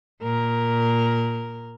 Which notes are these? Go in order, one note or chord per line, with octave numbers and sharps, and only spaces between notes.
A#2 A#4